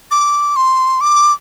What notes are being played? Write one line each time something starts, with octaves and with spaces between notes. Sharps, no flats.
D6
C6
D6